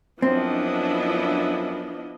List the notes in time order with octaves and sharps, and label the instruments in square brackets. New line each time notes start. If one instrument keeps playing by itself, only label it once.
[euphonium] F#2 [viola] F3 B3 [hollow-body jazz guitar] C4 [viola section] D4 E4 D#5